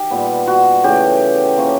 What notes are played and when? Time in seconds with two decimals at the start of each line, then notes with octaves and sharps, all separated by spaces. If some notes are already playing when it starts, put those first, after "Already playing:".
Already playing: D#3 G4
0.10 A#2 G3 B3
0.47 F#4
0.84 C#3 E3 A3 G4
1.57 F3 A#3 C#4